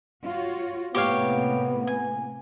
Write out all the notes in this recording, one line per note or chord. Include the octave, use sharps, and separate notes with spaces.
F4 F#4 C#5
A2 C3 A#3 B3 G4 C#5 F5
G#5